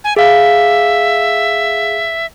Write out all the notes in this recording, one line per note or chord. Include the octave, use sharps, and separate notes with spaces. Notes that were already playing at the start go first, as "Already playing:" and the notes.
G#5
G#4 E5 F5